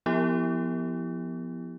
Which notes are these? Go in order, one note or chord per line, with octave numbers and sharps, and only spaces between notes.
F3 B3 E4 G4